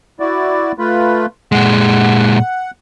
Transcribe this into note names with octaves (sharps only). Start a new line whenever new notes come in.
E4 F#4 D5
A3 F4 B4
A#2 G#3 F#5